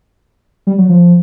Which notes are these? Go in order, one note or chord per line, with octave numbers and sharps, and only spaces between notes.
G3
F#3
F3